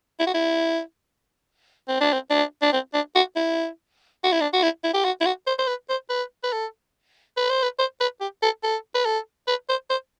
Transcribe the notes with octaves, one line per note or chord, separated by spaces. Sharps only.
E4
F#4
E4
C4
D4
C4
D4
D4
C4
D4
F#4
E4
F#4
E4
D4
F#4
E4
E4
G4
F#4
E4
F#4
C5
C5
B4
C5
B4
B4
A4
B4
C5
B4
C5
B4
G4
A4
A4
B4
A4
B4
C5
C5